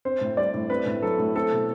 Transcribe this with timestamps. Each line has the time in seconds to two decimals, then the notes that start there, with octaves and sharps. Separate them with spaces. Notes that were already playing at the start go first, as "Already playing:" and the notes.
0.05 C4 C5
0.21 A2
0.37 G3 D5
0.54 A2
0.70 C4 B4
0.86 A2
1.02 F#3 A4
1.18 A2
1.36 C4 A4
1.51 B2